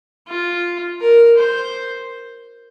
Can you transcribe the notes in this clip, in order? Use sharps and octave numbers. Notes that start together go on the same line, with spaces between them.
F4
A#4
C5